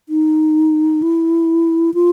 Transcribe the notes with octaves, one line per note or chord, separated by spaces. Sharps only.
D#4
E4
F4